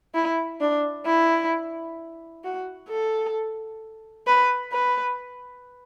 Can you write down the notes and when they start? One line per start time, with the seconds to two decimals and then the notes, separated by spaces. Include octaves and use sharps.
0.14 E4
0.61 D4
1.06 E4
2.44 F#4
2.89 A4
4.27 B4
4.73 B4